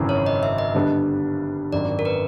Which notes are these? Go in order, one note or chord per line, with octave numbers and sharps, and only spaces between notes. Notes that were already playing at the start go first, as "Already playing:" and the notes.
Already playing: G#1 F#2 C#3 E3
C#5
D#5
E5
D#5
G2 D3 G3 B3 D4
G#1 F#2 D#3 D5
A#4
B4